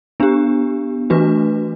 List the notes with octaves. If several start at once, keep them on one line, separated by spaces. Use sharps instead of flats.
B3 D4 G4
E3 A3 D4 F#4 B4